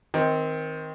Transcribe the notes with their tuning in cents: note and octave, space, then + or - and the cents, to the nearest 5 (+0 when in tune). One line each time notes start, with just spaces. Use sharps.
D#3 +20 C4 +0